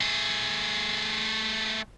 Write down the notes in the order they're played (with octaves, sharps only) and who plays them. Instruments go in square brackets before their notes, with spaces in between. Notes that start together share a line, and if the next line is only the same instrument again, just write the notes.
[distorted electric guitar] A3 G#4